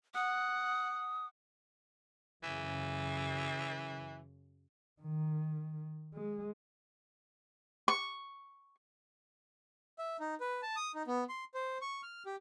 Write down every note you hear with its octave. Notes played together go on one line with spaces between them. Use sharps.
F#5 D#6
F#2 C#3 E3
D#3
G#3
C#6
E5
D#4
B4
A5
D#6
D#4
B3
C6
C5
C#6
F6
G4